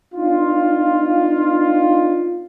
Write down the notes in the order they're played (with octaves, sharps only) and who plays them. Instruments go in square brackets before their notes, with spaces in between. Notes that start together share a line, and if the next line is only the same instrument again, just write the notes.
[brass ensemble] B3 D4 D#4 F4